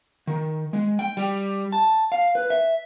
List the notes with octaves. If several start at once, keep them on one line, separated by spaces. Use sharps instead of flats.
D#3
G#3
G5
G3
A5
F5
B4
E5